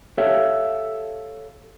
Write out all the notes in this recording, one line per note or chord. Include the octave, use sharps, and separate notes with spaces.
G4 A4 C#5 E5 F5 G5